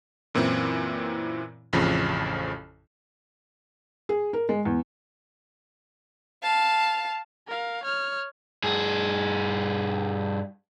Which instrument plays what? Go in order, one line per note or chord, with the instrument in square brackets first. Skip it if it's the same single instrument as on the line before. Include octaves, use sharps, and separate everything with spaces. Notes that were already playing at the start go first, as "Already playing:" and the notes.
[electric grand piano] F#2 A#2 E3 C4 E4
A1 F2 C#3 F3
[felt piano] G#4
A#4
G#3
E2
[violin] F5 A5
[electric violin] A#4 F5
C#5 F6
[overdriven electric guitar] G2 G#4